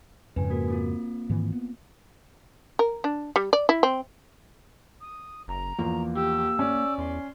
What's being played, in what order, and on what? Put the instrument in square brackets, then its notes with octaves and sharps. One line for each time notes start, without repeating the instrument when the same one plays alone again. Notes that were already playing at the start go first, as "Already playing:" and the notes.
[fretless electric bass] F2 G#2 C#3 [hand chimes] B4 G#5
[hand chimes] A#3 F#4 A#4
A#3 C4 F4
[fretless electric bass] G#2 D#3 E3
B3
[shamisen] A#4
D4
G3
D5
E4
C4
[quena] D#6
[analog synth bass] F#1 [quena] A#5
[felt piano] E2 F3 [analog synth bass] A#3
[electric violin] G4 [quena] E6
[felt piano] C#4 [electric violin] D5
[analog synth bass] E2 [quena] C6